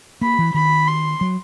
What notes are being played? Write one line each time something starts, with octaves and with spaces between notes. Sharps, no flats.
A#3 B5
E3
D#3 B5
C6
F#3